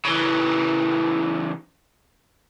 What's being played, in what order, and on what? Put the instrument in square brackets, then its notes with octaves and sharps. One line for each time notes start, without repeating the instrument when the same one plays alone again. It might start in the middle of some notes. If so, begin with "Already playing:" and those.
[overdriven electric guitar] C#3 E3